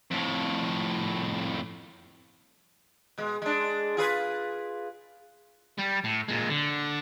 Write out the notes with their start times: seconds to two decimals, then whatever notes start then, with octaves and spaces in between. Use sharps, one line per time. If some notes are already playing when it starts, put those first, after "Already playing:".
0.11 F2 A2
3.18 B2 G#3
3.42 G#3 D4
3.97 F4 G#4 B4
5.78 G3
6.04 A2
6.28 A#2 G#3
6.49 D3